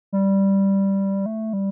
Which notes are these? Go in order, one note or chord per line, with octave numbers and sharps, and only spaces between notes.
G3
A3
G3